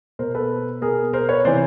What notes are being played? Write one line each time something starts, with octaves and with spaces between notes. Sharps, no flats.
B2 A#4 C5
A4 B4
B2 G#4 A#4
A#4 C5
B4 C#5
C3 E3 C5 D5